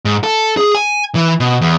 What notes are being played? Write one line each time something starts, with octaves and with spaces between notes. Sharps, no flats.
G#2
A4
G#4
G#5
E3
B2
E2